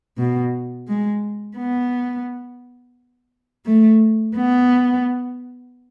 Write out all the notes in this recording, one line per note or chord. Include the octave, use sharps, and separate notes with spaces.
B2
G#3
B3
A3
B3